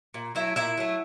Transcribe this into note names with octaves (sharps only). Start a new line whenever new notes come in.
A#2
F#3 A3 E4 E5
A#2 E4 E5
F#3 A3